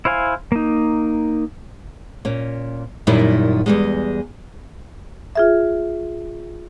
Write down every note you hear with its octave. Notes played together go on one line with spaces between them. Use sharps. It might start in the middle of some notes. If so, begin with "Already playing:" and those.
E4 C5 F5 G#5
A#3 D#4
A#2 C#4
F#2 A#2 D#3 G3 E4
E2 G3 G#3
F4 G#4 E5